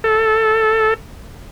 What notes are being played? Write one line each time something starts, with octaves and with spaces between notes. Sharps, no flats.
A4